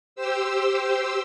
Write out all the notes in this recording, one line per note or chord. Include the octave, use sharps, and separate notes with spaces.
G4 C5 E6